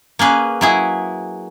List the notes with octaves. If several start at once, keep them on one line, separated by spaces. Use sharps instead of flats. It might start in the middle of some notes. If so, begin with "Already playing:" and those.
A#3 C#4 G#4 B4
F#3 E4 G#4